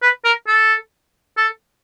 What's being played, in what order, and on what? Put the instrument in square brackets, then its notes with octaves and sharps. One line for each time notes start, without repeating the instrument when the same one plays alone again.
[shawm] B4
A#4
A4
A4